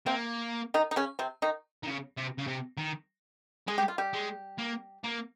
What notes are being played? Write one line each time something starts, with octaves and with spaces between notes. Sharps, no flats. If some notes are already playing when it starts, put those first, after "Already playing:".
C3 A#3 C4
D#3 D#4
D#4
C#3 C#4
C3 C4
D#3 D#4
D#3
C#3
C3
C#3
C3
D#3
G#3 G#4
G4
F4
G3 G4
G#3
A#3
A#3